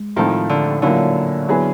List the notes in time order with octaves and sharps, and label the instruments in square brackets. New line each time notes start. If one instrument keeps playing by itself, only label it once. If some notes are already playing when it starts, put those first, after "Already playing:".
Already playing: [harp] G#3
[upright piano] A2 F3 A3 C4 [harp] D#3
[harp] D3
[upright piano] A#2 F#3 A#3 C#4 E4 [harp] D3
[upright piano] F#3 B3 E4 G#4 B4